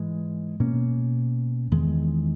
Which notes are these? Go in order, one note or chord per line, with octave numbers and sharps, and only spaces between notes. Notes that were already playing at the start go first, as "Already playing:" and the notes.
Already playing: G#2 E3 G#3
B2 A#3 C#4
E2 D#3 G#3